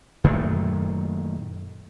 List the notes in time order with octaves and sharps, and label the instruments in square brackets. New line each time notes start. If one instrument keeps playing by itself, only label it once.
[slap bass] F#2 A#2 D#3 A3